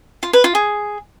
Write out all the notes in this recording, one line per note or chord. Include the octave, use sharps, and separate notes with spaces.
F4
B4
F4
G#4